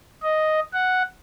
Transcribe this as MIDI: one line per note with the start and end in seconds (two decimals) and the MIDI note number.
0.23 0.60 75
0.74 1.03 78